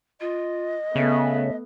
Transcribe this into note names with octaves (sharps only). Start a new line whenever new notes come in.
F4 D#5
C#3 A3 B3 E5